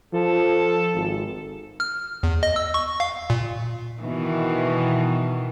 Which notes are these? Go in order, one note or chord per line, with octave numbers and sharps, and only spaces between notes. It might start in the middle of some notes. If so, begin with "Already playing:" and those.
F3 A4
G#1
F6
E2
D#5
E6
C#6
F5
A#2
B2 D#3 E3